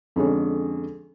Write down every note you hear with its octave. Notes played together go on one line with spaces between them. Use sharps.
F2 D3 G#3 C#4